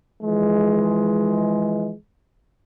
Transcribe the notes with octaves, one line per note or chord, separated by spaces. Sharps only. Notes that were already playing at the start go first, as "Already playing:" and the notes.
E3 F3 G#3